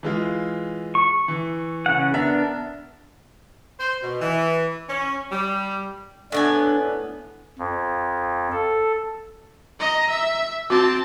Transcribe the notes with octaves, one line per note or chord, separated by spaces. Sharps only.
E3 G#3 F4
C#6
E3
C#3 F#5
B3 D4 A#4 E5
C5
B2
E3
C#4
G3
A2 B3 D4 G#5
F2
A4
D#5 A#5
E5
C4 F#4 A5